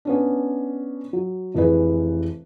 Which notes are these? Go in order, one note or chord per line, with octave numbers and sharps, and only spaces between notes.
B3 C#4 D4
F#3
F1 E3 G#4 B4